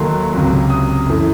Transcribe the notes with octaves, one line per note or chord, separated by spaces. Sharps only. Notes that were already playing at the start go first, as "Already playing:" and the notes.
Already playing: D#2 D#3 F#3 A3 A5 C6
C#2 C3 F#3
D#6
F#2 E3 A3